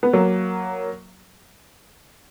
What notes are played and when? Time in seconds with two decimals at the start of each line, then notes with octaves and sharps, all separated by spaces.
0.03 B3
0.13 F#3 A#3